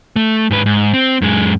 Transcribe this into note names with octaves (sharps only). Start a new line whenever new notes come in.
A3
G#2 B4
G#2
C4
F#2 G#3